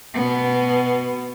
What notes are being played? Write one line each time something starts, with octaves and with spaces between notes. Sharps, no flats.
B2 B3